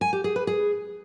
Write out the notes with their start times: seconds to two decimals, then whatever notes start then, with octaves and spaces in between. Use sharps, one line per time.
0.01 G#5
0.13 G4
0.24 G#4
0.36 B4
0.47 G#4